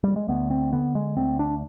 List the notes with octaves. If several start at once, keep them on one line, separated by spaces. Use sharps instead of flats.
G3
G#3
D2 B3
C4
D3 B3
G#3
D2 C4
D4